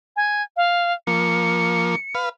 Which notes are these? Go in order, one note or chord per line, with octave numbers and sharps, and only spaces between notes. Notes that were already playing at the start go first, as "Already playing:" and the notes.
G#5
F5
F3 A#3 C#7
B4 F5